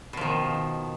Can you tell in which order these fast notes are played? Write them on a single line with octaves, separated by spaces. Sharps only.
B2 F3 D#3